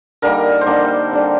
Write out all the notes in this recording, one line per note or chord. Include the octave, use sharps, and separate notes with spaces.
D3 G3 A#3 D#4 A#4
C5
D3 G3 A#3 D#4 D5
D3 G3 C4